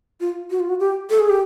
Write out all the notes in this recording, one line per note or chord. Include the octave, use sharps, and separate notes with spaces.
F4
F#4
F4
F#4
G4
A4
G#4
G4